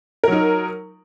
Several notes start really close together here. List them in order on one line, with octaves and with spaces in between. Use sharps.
A#4 F#3 D#4